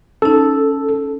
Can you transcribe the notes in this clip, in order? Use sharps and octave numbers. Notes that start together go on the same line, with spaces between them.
C#4 D#4 A4